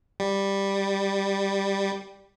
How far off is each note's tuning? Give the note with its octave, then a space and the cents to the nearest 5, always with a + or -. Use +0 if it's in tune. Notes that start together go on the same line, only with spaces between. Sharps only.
G3 +5